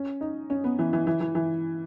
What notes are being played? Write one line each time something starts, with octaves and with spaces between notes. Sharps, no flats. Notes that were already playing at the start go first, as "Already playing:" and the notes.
Already playing: C#4
D#4
C#4
B3
E3
E3
E3
E3
E3